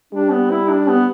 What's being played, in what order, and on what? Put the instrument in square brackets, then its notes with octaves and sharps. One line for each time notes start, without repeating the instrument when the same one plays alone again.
[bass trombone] G3 [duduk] D4
[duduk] B3
E4
D4
B3